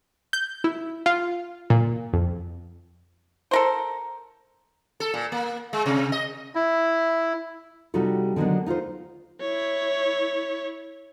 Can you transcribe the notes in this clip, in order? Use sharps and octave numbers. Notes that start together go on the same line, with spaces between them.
G6
E4
F4
A#2
F2
A4 A#4 C5
A4
A#2
A#3
G#3
C3
D#5
E4
C3 G3 D#4 F4 F#4 A4
D3 D#3 F#3 G#3 B3 D4
D#4 F4 A4 C5
E4 C#5